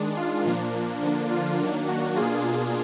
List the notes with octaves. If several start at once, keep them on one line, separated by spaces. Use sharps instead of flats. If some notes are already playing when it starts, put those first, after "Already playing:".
Already playing: D#3 G#3 D4
F4
A#2 F3 A#3 D4
D3 F3 A#3 D4
F4
D#3 F#3 A#3 D4
F#4
B2 A#3 D4 F4 G#4